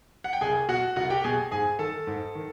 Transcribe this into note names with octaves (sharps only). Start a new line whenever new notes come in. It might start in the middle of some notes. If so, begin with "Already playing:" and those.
F#5
G5
C2 G#4 G#5
B2 F#4 F#5
C2 F#4 F#5
G4 G5
B2 G#4 G#5
G#2 G#4 G#5
D#3 A4 A5
G#2
D#3